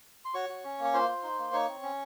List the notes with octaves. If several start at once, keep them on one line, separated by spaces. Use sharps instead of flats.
C6
F#4 C#5 C#6
F#4
C#4
A#3
C#6
F4 C5 C6
F4
D#4
A#3
D#4 C#5 C#6
C4
C#4